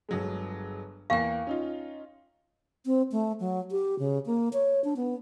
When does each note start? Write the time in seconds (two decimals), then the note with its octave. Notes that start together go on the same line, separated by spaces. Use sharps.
0.09 G1 F#3 G#3
1.10 E2 A#3 F5 G5 C#6
1.47 C#4 D#4 F4
2.85 C4
3.12 A3
3.40 F#3
3.71 G4
3.99 C#3
4.26 A#3
4.53 C#5
4.84 D4
4.96 B3